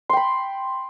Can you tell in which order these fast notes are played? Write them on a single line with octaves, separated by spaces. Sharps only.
C6 G5 B5